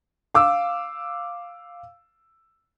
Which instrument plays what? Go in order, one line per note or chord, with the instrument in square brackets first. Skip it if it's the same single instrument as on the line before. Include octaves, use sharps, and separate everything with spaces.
[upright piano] F5 D6 E6